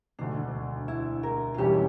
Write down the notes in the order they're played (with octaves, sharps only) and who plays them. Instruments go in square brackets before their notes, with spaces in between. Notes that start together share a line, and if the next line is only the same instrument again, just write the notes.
[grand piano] E1 D2 D3 [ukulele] D4
[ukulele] E4
A#4
F4
[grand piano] E1 E2 E3 G3 C#4 [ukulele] G4